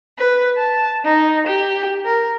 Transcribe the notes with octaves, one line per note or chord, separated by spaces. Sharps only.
B4
A5
D#4
G4
A#4